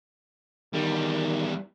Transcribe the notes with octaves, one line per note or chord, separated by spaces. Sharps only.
E2 D#3 G3